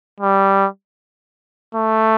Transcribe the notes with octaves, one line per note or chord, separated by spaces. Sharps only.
G3
A3